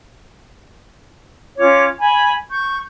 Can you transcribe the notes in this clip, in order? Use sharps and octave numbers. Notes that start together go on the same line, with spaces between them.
C#4 F4 C#5 D6
G#5 B5
C#6 G6